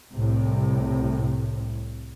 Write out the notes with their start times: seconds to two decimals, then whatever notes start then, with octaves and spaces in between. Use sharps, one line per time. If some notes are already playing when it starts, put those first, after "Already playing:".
0.13 C2 A2 C3